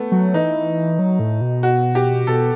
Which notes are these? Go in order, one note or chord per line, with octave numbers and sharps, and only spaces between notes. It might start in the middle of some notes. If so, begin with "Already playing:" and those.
Already playing: A3 B3
F#3
E3 D#4
F#3
A2
B2
F#4
G4
B2 A4